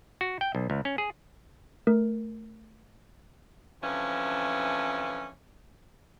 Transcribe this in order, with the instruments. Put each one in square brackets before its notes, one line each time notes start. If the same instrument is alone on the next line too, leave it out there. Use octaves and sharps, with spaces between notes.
[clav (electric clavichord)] F#4
G5
B1
C#2
C#4
G#4
[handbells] A3 A#4
[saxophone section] D2 C3 E3 F3 C#4